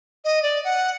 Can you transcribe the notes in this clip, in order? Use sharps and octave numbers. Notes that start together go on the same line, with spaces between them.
D#5
D5
F#5